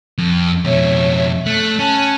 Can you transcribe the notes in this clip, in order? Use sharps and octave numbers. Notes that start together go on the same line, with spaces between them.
F2
F2 B2 C#5 E5
A3 F#6
C#4 A5 F#6